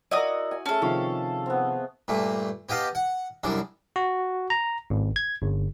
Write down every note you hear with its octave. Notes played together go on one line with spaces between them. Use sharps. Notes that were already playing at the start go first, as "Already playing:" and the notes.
E4 F#4 A#4 D5 D#5 D#6
G#5
A3 C#4 G#4 A4 A5
C3 D#3 F3 G4 F5 C#6
B3 C4
G2 A#2 A3
B3 G4 D#5 F5 A5
F#5
C2 F#2 C#3 D4
F#4
A#5
G#1
G#6
G1